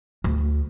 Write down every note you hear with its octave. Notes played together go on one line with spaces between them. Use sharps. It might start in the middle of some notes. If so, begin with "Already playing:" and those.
D2